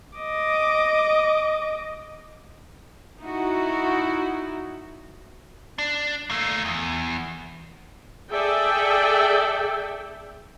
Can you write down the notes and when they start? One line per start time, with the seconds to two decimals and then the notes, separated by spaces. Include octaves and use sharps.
0.18 D#5 D6
3.22 D#4 E4 F#4
5.78 D4
6.30 A3 A#3
6.65 E2
8.31 G#4 A4 D5 E5 G5